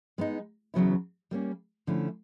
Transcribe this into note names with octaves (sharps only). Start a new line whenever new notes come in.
G#3 B3 D#4
E2 C#3 F#3 B3 E4
G3 A#3 C#4
D3 F3 A3 C#4 E4